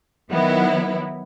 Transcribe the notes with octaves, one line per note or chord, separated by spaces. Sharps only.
D#3 F#3 B3 E4